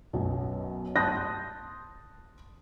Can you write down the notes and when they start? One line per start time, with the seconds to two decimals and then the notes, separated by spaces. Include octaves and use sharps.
0.13 B1 F#2 B2
0.96 A5 C6 D#6 F#6 G6 A#6